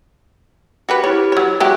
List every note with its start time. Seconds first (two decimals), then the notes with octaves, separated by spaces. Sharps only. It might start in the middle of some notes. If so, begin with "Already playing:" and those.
0.89 F#4 G4 B4
1.04 E4 G4 C#5
1.32 F#3 C#5
1.60 F#3 G#3 F#4 G4 E5 F#6